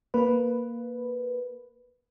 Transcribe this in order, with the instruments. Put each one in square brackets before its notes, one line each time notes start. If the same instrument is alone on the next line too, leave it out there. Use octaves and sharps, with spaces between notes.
[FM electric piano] A#3 B4